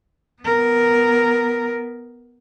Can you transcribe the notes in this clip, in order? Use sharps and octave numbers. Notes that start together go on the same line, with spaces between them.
B3 A#4